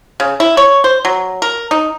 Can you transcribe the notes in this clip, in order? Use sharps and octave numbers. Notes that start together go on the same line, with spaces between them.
C#3
E4
C#5
C5
F#3
A#4
D#4